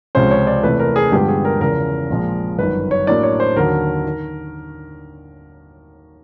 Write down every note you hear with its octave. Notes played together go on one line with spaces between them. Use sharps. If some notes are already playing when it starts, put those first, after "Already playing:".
C#2 C3 F3 G#3 C#4 C5
C#5
D5
E2 C3 E3 A3 B4
A#4
G#4
G2 D3 F3 G#3 B3 G4
G#4
A#4
E2 C#3 F3 A#4
A#1 A#2 F3 G#3
G1 F#2 D#3 B4
C#5
A2 F#3 A#3 D4 D5
C#5
C5
D#2 D3 F#3 A#4
D#3